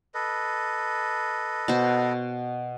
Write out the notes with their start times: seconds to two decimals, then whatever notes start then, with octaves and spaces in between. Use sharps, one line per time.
0.14 A4 B4 D#5
1.68 B2 C5